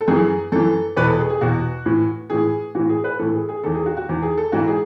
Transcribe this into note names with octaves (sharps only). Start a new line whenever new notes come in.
A4
F#2 E3 G#4
F#2 E3 A4
E2 B2 B4
A4
G#4
G#4
E2 B2 F#4
A2 E3
A2 E3 G#4
A2 E3 F#4
G#4
B4
A2 E3 A4
G#4
G#4
E2 D#3 A4
G#4
F#4
F#4
E2 D#3
G#4
A4
G#2 E3 F#4
G#4